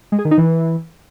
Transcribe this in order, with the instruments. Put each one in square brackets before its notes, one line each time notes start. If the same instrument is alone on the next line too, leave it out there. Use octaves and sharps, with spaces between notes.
[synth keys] G#3
G#4
D#3
D#4
E3